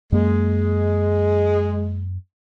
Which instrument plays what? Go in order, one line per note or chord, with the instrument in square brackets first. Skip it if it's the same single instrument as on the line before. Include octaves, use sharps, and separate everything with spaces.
[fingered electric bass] F#2 A#3 [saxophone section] G#3